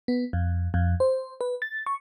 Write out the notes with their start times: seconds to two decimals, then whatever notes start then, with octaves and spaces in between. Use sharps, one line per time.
0.08 B3
0.33 F2
0.74 F2
1.00 C5
1.41 B4
1.62 A6
1.86 C#6